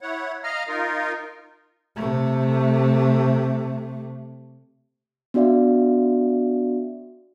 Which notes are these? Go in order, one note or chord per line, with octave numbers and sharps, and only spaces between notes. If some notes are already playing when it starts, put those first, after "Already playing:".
E4 C#5 F#5
D#5 F5 A#5 F6
D#4 F4 A#4
C3 A3
B3 D4 F#4 D5 E5 F5